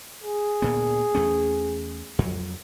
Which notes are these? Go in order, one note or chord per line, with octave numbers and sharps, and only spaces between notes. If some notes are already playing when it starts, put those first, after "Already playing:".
G#4
D2 A#2 B3
E2 A3 C#4
F2 F#3